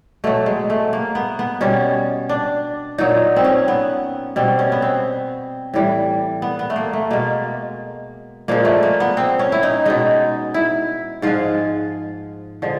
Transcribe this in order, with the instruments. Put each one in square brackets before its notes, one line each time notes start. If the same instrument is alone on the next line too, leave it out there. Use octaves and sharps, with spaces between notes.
[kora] B2 F#3 A3
G#3
A3
A#3
B3
B3
B2 G3 C#4
D4
A#2 F#3 D#4
C4
C#4
B3
B2 G3 C4
C#4
B3
C4
A2 E3 G3
B3
B3
A3
A#3
A3
B2 G#3 A#3
A#2 F3 G#3 A#3
A3
A#3
B3
C4
C#4
E4
D#4
B2 G#3 D#4
E4
G#2 F3 G#3 F4
D3 F3 G#3